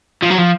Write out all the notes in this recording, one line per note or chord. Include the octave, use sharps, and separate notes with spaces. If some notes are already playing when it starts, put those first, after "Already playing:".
F3
F#3
F3